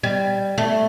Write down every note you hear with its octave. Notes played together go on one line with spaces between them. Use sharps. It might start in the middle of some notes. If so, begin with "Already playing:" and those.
G3
A3